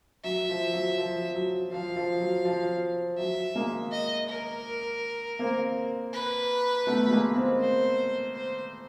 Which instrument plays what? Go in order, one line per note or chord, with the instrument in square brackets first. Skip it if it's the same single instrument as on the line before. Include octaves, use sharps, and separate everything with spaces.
[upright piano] F#3 [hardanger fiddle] E5
[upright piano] F3
F#3
F3
F#3
[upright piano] F3 [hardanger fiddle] F5
[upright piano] F3
F#3
F3
[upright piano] F#3 [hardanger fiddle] E5
[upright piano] G#3 A#3
[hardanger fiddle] D#5
A#4
[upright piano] A#3 C4
[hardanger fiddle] B4
[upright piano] A3 B3
G#3 A#3
A#3 C4
[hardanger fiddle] C5
C5